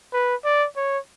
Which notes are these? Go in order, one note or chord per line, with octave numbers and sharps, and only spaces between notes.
B4
D5
C#5